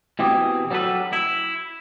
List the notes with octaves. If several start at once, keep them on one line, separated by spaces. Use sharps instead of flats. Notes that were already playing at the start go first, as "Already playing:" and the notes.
B2 E3 C4 G4 G#4
F#3 G3 D4 A4 B4
E4